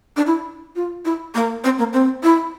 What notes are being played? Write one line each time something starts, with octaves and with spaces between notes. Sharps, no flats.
D4
E4
F4
E4
A#3
C4
A#3
C4
E4